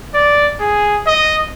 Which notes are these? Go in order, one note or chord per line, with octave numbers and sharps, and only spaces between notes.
D5
G#4
D#5